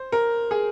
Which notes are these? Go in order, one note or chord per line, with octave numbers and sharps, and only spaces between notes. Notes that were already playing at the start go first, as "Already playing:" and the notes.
Already playing: C5
A#4
G#4